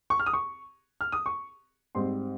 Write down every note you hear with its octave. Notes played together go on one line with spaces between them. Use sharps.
C#6
F6
D#6
C#6
F6
D#6
C#6
G#2 G3 C4 C6